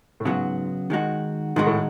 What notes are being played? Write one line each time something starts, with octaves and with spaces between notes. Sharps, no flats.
A2
G#2 C#3 F#3 B3 F#4
D#3 G#3 D#4 F#4
G#2 D#3 G#3 D#4 F#4
A2